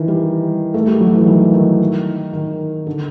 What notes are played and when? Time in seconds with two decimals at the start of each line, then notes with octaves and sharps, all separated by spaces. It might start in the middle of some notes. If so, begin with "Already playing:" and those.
Already playing: D#3 E3
0.08 G3
0.74 A3
0.87 G3
1.01 F#3
1.14 E3
1.27 D#3
1.54 D#3
2.33 D#3
2.87 D3